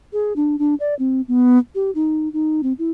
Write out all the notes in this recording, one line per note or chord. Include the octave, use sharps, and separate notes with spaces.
G#4
D4
D4
D5
C4
B3
G4
D#4
D#4
C4
E4